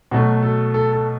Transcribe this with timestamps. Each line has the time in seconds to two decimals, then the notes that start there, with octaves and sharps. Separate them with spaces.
0.11 B2 F#3 A3 F#4
0.43 A4
0.74 A4
0.93 A4